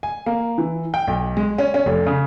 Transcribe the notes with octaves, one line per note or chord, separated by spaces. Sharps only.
G#5
A#3
E3
G5
B1
G#3
C#4
C#4
F1
C#3